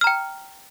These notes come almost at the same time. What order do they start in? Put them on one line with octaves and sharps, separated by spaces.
F6 A#5 G5